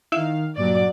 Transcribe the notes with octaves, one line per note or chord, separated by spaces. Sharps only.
D#3 E4 E5 F5
G2 A#2 F#3 D5